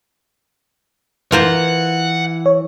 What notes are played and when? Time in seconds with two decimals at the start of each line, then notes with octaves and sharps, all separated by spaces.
1.32 E3 F4 A#4 C5 F#5
2.46 C#5